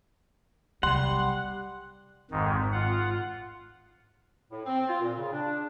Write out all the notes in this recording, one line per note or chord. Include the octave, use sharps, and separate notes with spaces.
B1 C3 G3 F#5 C6
G#1 F2 G#2 D#3
F4 F#5
A2
C4
F4
A#2
C#3
D4